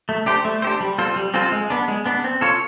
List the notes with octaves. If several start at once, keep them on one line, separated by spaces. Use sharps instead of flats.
A3
D4 G4 C5
A3
D4 G4 C5
G3
C4 F4 A4 C5
G3
C4 F4 A4 C5
G#3
B3 D4
G#3
B3 D4
C4
F4 A4 C#5